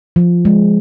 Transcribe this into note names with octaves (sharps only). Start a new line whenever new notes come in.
F3
G#3